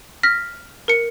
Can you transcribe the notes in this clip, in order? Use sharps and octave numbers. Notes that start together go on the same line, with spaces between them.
F6 A#6 B6
A#4 C#7